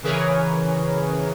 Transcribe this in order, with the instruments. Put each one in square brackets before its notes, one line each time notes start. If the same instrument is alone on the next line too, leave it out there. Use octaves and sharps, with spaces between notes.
[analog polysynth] C#3 E3 G#4 A#4 B4 C#5